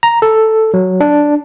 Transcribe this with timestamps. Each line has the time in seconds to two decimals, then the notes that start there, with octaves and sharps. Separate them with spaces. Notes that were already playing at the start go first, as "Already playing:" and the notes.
0.03 A#5
0.22 A4
0.74 F#3
1.00 D4